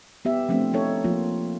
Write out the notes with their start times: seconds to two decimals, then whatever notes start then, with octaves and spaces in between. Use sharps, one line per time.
0.25 B3 G4 E5
0.49 F3 A3 C4 D4
0.73 D#4 A4 C#5
1.04 F3 A#3 F4